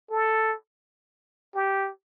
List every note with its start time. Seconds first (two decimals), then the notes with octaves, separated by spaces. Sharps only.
0.11 A4
1.55 G4